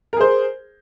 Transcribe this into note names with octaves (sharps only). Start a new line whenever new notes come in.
G#4 A#4 C5